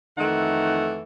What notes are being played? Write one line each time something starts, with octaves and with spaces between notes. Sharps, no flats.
F2 D#3 E3 A3 D#4 F#5